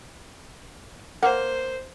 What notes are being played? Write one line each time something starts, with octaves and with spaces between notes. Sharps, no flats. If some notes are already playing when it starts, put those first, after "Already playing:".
A#3 C5 F#5